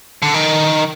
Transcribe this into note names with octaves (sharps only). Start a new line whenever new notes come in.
D3
D#3